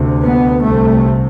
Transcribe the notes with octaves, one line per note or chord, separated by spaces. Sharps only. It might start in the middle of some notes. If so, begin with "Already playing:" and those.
Already playing: D2 C3
B3
C2 C3 A3